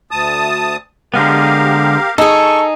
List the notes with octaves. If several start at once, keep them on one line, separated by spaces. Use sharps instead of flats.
D2 A5 D#6
D3 G#3 B3 G4 A#4 F5
D#4 G#4 A4 C#6